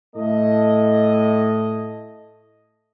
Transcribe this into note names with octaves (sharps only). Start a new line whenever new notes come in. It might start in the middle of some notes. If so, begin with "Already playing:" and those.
A2 A3 D#5